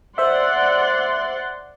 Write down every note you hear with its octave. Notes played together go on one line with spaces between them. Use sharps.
C5 D5 E5 F#5 C6